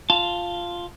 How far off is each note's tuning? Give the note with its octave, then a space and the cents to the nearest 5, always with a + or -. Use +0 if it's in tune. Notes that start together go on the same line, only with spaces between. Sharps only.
F4 +0 A5 +0